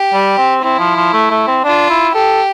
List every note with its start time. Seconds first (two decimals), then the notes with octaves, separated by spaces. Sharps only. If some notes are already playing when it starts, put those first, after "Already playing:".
Already playing: G4
0.13 G3
0.38 C4
0.63 C4 E4
0.79 F3
0.96 F3
1.13 A3
1.31 A3
1.47 C4
1.64 D4 F4
1.90 E4
2.15 G4 A4